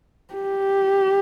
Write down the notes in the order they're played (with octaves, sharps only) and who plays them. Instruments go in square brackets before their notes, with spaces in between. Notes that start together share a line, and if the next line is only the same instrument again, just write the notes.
[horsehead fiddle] G4